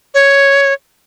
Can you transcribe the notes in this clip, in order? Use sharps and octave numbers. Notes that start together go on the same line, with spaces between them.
C#5